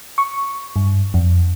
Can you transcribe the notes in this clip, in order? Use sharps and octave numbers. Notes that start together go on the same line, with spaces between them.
C#6
G2
F2